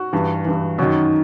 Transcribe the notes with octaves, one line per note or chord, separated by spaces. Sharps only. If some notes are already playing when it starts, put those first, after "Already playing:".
Already playing: F#4
G2 E3
G2 E3
F#2 D#3 F#4